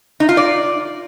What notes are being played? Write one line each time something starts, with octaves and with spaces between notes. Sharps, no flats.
D#4
F4
D5